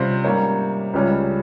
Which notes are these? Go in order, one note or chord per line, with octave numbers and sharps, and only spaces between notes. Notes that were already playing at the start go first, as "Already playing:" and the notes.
Already playing: C3 G3 C#4 F4 C5
G#2 G3 A#3 C#4 C#5
C#2 C#3 G3 C#4